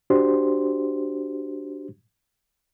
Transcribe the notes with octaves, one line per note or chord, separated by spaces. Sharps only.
D4 F#4 G4 C5 C6